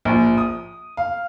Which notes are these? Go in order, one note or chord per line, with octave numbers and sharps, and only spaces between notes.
A#1
D#6
F5